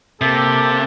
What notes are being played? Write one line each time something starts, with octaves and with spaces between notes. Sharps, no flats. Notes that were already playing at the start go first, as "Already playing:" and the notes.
C3 A#3 G4 A4